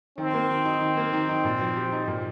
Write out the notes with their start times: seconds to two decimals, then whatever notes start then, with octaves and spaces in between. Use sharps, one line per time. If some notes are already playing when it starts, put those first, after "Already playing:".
0.18 D#3 C4
0.34 A#3
0.49 D#3
0.65 D#4
0.80 D#3
0.97 A#3
1.13 D#3
1.29 D#4
1.45 A#2
1.61 F3
1.77 G4
1.92 D#4
2.08 A#2